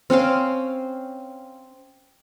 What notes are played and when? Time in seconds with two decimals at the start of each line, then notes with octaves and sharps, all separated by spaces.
0.10 C4 C#4 C5 F5